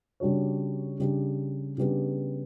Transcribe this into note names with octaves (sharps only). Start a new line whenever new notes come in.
C#3 G3 D4 F#4 C#5
C#3 G3 D4 G4
C#3 G3 B3 D4 G4